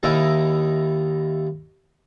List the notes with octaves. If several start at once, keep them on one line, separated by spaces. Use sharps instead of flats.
D#2 D#4 E4 A#4 A5